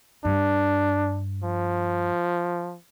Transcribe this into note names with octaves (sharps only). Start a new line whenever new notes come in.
G2 D4
F3